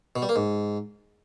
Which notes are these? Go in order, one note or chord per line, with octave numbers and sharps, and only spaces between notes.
B2
G3
A#3
G#2